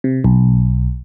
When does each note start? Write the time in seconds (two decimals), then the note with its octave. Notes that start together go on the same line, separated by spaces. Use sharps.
0.04 C3
0.24 B1